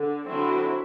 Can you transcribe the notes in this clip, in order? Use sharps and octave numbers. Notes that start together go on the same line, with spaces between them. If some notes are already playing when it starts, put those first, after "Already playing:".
Already playing: D3
D3 F#3 C4 E4